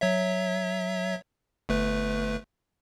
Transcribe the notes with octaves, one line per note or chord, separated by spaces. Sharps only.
F#3 C#5 E5
G1 A3 B4